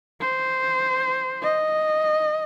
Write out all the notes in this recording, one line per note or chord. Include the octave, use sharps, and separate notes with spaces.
C5
D#5